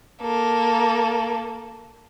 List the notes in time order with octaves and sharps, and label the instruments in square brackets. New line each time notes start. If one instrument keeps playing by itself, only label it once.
[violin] A#3 A4